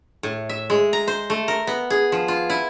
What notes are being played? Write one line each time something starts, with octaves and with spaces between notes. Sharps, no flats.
A2
E5
G#3
A#5
C5
A3
A#4
B3
G#4
F3
F4
E4